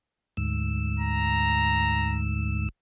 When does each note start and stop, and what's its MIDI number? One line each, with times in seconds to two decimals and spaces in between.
0.37 2.69 38
0.37 2.69 44
0.37 2.69 88
1.00 2.19 82